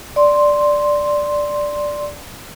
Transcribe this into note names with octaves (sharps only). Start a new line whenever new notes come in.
D5 C6